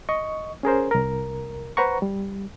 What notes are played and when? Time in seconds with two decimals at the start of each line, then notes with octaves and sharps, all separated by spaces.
0.09 D#5 C#6
0.63 C#4 G#4 A#4 C5
0.91 C2 A#4
1.77 B4 C5 F#5 A#5 C#6
2.02 G3